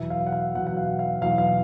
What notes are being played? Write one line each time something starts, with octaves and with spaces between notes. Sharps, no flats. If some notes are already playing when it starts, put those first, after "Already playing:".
Already playing: E2 B2 F#3 E5
F5
F#5
F5
E2 B2 F#3 F#5
F#5
F5
F5
E2 B2 F#3 F5
F5